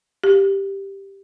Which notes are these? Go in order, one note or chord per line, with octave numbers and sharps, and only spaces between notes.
G4